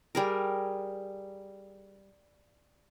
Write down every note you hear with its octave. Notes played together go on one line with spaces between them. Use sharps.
G3 G#4 A#4